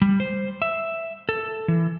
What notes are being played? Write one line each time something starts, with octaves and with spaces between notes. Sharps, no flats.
G3
C5
E5
A4
E3